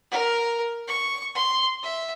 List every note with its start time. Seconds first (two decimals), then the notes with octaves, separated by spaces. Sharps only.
0.11 A#4
0.88 C#6
1.35 C6
1.83 E5